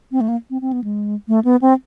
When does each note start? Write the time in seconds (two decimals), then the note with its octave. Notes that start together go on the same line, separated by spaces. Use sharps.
0.12 C4
0.21 A3
0.28 A#3
0.50 C4
0.61 C4
0.73 B3
0.84 G#3
1.28 A3
1.45 B3
1.62 C4